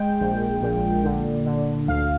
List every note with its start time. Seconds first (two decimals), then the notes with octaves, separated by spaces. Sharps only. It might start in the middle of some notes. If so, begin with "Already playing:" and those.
Already playing: G#3 G5
0.20 A#1
0.62 A#2
1.04 D3
1.46 D3
1.88 D2 F5